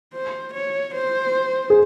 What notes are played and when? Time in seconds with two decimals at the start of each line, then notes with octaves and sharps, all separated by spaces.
0.13 C5
0.54 C#5
0.95 C5
1.70 G#4